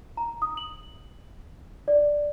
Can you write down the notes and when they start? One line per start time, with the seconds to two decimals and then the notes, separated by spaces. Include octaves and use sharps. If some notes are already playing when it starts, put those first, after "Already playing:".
0.17 A#5
0.42 D#6
0.57 F#7
1.88 D5